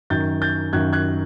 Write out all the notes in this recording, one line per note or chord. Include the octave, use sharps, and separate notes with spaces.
F#2 D#3 G6 A6
G6 A6
F#2 D#3 F#6 G#6
F#6 G#6